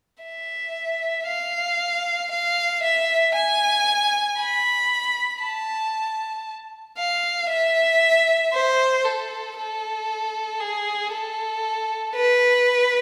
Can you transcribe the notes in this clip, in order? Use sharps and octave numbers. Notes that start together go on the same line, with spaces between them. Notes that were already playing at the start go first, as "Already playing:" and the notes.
E5
F5
F5
E5
G#5
B5
A5
F5
E5
C5
A4
A4
G#4
A4
B4